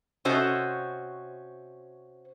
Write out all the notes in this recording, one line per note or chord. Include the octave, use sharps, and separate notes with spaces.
C3 C#4 F#4 C5 D#5 A5